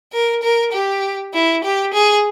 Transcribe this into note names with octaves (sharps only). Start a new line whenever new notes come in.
A#4
A#4
G4
E4
G4
G#4